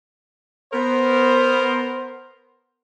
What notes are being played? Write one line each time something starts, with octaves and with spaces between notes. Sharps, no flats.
B3 A#4 C5